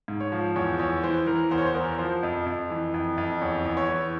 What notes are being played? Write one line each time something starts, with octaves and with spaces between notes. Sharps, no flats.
G#2
C#5
F3
E2 C#5
E2 C#5
E3 C5
E3 A#4
E2 C5
C#5
C5
E2 A#4
F3 C5
F2
F2
E3
F2
F2
E2 C#5
E2
C#5
E3